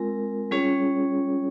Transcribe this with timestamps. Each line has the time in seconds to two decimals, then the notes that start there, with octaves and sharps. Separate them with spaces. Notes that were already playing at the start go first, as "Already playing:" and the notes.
Already playing: G#3 C4 F4 A#4
0.51 G3 C#4 F4 G#4 C#5